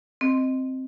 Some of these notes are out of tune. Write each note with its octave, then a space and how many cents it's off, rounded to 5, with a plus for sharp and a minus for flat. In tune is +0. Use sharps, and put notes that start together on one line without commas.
C4 +0 D#5 +0